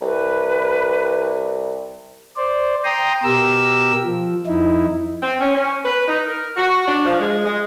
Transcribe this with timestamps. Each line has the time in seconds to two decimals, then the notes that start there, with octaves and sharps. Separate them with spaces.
0.01 C2 B4
2.37 C5 D5
2.84 G5 A#5 C6 D#6
3.23 B2 G4 A#4 E6
4.04 F3
4.46 F2 D#4 E4
5.23 C4
5.41 C#4
5.55 C#4
5.85 B4
6.08 D#4
6.27 A#4
6.57 F#4
6.88 D4
7.06 F3
7.21 G#3
7.45 G#3